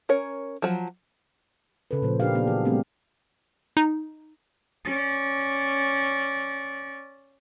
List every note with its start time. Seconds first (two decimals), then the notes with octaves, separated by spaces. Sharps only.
0.09 C#4 A#4 C#5
0.62 F3 F#3
1.91 C#3 A4 B4
2.02 A#2 F3 C5
2.20 A#2 D4 G4 A#4 F5
2.35 A#3 B3 D4 G4
2.47 E3 F#3 F#4 G#4
2.65 G3 A3 B3 C4 D4 G4
3.77 D#4
4.85 C#4 D5